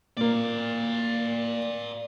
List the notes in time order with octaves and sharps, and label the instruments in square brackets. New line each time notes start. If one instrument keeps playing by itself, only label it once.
[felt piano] A#2 A#3 [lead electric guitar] D5 F5